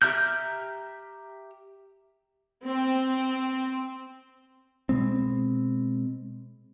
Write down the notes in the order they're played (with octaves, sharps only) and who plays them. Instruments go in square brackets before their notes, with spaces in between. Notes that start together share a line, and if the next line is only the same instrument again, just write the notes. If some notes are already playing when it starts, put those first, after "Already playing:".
[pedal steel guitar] G4 E5 A#5 F6 G6
[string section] C4
[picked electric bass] B2 G#3 C4